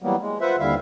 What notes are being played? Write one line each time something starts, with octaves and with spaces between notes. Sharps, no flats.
E3 F#3 G3 A#3 B3
G#3
F4 B4 C5 E5 F#5
D#2 D3 G3 E4 E5 F5